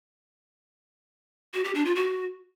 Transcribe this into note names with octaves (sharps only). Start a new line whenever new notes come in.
F#4
G4
D4
F4
F#4